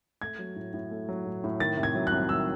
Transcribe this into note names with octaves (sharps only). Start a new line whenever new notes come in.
A3 G#6
F#3
A2
A2
A3
F#3
A2
A2
D#3 A6
C3
G#6
F#3
C2 F#6
D#3 E6